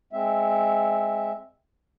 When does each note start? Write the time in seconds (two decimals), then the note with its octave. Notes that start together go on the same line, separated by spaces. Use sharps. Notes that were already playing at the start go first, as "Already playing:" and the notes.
0.13 G#3 C4 E5